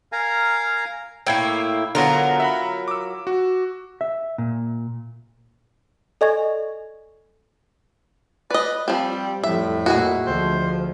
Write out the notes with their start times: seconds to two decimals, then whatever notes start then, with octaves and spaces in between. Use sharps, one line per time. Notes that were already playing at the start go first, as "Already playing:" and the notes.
0.12 A#4 F5 G#5 A#5
1.27 A2 A#3 E4 G5 G#6 C7
1.95 D3 F#3 B3 F4 A#4
2.40 E5 F#5 B5
2.88 D6 E6
3.27 F#4
4.01 E5
4.38 A#2
6.21 A4 D5 D#5 G#5 C#6 G#6
8.50 B4 D5 D#5
8.88 F3 G3 C4
9.44 F2 A2 G3 E5
9.86 A#2 G#3 E4 F#4
10.26 D2 F3 C5